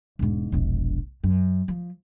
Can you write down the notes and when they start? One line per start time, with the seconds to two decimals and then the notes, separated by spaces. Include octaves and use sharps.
0.19 E1 G#2
0.52 E1 A#1
1.23 F#2
1.68 F3